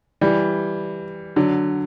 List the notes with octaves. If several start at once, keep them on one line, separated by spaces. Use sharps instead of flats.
E3 G3
D3 F#3